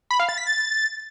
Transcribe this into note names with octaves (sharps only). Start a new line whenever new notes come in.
B5
F5
A6
B6
A6